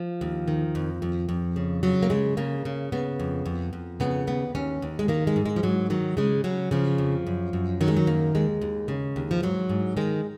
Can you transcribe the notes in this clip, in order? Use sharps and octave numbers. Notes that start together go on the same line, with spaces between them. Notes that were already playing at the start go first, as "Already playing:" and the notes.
Already playing: F3
D#2
D#3
F2
F2
F2
C#3
C#3 F#3
A#3
C#3 G#3
C#3 A#3
C#3
C#3 B3
F2
F2
F2
C#3 B3
D#2 B3
D#2 C#4
D#2
G#3
D#3 A#3
G#3
G#2
G#3
F3
G#2 F#3
D#3 F#3
C#3 G#3
C#3 F#3
C#3 F3
F2
F#2
F#2
D#3 F#3
G#3
F#3
F#2 A#3
D#2 G#3
D#2
C#3
D#2
F3
G#2 F#3
G#2
D#3 G#3